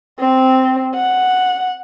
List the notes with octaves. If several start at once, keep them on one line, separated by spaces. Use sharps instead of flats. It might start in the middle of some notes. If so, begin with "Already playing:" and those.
C4
F#5